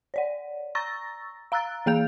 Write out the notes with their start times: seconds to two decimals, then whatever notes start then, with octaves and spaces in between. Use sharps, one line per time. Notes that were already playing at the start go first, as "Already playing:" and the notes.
0.14 C#5 D5 F#5
0.75 A#5 C#6 E6 A6 A#6
1.52 F5 A#5 E6 F#6 A6
1.86 E3 A#3 G#4 F5 G6 F7